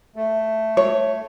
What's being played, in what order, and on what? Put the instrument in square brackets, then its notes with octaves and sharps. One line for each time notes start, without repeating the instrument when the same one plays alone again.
[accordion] A3
[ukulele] C#5